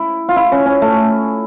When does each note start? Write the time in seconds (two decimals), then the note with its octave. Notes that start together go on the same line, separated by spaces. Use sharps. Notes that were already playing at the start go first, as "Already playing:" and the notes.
Already playing: E4
0.29 F4
0.36 E4
0.52 C#4
0.66 C#4
0.82 A3